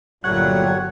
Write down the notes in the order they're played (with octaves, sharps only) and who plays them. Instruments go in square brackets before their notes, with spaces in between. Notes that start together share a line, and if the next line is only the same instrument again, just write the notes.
[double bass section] G1 F#3 [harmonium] A#2 G3 A3 [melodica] C#5 F#5 [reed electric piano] F#6